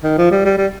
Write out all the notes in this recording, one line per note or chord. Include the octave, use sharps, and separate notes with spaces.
D#3
F3
G3
G3
G3